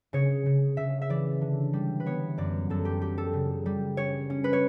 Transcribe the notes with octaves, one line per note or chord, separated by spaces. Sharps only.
C#3 C#5
C#3
C#3 E5
E5
E3 D5
D3
G3
B4
B3 C#5
F#2 D5
F#2 A4
G4
G3 G4
A4
C#3
G3
C#4 C#5
C#4
B4
C#5